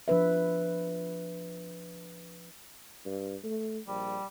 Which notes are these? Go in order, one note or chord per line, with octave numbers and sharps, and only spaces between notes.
F3 D4 B4 E5
G2
A3
A#1 G3